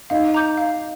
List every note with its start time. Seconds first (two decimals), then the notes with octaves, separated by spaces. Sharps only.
0.10 D#4 F5
0.34 A#5 D6 G6
0.57 F5